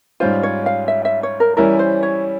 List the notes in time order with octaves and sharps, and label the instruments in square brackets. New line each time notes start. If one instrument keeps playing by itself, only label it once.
[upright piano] G#2 G3 C#4 F4 [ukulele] C5
[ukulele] C#5
F5
E5
E5
C#5
A#4
[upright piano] E3 G3 C#4 E4 [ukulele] A#4
[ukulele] C5
C#5